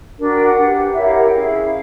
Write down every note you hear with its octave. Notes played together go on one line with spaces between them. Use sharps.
D4 F#4 A#4
G5
F#5
D4 G4 B4
E4 G4 A#4 C#5 E5
F5
F#5
G5
C#4 E4 G#4 F5